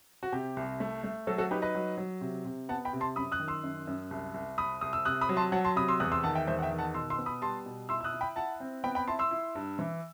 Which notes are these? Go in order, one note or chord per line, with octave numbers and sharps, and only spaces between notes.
F#4
C3 G4
C2
A3
A3
F#3 F#4 A4
F#4 A4
D#4 G4 B4
B4 D#5
F#3
F#3
C3
C3
B3 F#5 A5
G5 B5
C3
A5 C6
F#2 B5 D#6
D#6 F#6
D#3
C6 E6
F#2
F#2
C2
C2
C2 B5 D#6
C2 D#6
E6
C3 D#6 F#6
B5 D#6
F#3
A5 C6
F#3 F#5 A5
A5 C6
C3 B5 D#6
C6 E6
E2 D#6 F#6
C6 E6
D#3 F#5 A5
E5 G5
E2 C5 E5
F#5
E5 G5
D#3
F#5 A5
B2 C6 E6
C6 E6
B3
B5 D#6
G3 A5 C6
B2
E4 C6 E6
E6
D#6 F#6
E4
G5 B5
E4 F#5 A5
C4
B3 G5 B5
G5 B5
E4 A5 C6
C6 E6
E4
G2
E3